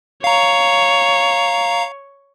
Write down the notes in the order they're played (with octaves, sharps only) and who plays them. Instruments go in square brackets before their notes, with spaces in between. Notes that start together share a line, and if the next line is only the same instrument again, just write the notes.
[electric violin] C#5 [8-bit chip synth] F5 A#5